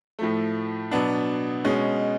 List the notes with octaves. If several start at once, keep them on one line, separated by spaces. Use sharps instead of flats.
A2 F3 A3
B2 F#3 B3 D4
B2 G#3 C#4